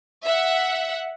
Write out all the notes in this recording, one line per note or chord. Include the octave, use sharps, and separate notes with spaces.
E5 F#5